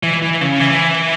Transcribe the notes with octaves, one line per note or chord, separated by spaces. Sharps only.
E3
E3
C#3
E3